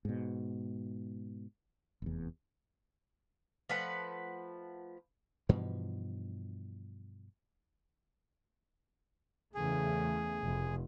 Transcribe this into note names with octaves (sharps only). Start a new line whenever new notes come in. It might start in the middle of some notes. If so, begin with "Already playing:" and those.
G#2 B2
F1 E2
F3 A3 B4 F#5
G2 B2 E3 F3
E2 C#3 A3 G#4
F1